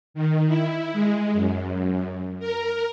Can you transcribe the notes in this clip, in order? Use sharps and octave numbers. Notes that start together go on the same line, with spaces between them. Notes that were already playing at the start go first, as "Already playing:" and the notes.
D#3
E4
G#3
F#2
A#4